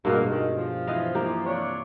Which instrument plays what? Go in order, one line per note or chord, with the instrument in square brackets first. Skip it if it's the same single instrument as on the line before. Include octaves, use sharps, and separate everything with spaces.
[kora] G2 B2 G#3 [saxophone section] A#3
[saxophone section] D#3
F3
[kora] E3 D#5 F5
E3 A#3 G4
[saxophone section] C3 D4 C#5